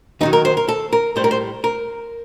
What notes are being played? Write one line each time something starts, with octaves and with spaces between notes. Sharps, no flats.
D#2 D#3 F#3 D#4
A#4
C5
A#4
A4
A#4
A2 G3 C5
A#4
C5
A#4